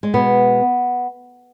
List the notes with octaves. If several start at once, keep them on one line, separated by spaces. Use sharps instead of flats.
G#3
B2 G#3 B3